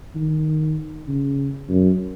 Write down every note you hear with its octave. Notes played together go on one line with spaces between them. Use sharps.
D#3
C#3
F#2